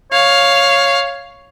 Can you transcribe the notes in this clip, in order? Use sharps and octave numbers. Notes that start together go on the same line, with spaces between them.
C#5 F5